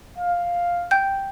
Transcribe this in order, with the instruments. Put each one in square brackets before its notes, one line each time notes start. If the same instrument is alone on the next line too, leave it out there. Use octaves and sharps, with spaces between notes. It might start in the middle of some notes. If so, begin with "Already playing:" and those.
[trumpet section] F5
[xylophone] G5 G6